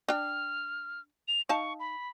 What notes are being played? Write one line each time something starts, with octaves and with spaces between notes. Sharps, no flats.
D4 G5 F6
F7
D#4 F5 A5 C#6
B5